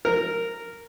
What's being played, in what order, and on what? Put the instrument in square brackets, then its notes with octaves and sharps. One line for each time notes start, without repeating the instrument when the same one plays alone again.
[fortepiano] A#4